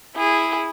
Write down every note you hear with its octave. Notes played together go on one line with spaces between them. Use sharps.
E4 G#4